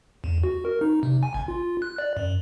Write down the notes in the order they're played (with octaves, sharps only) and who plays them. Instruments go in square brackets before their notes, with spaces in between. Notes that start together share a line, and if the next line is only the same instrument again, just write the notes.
[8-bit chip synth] E2
F#4
A#4
D#4
C3
G#5
G#1
F4
F#6
D5
F#2